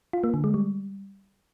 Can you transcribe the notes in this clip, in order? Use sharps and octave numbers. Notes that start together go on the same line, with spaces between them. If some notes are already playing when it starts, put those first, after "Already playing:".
F4
A#3
D3
G#3
G3